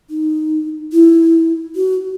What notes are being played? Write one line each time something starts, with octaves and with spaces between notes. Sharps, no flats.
D#4
E4
F#4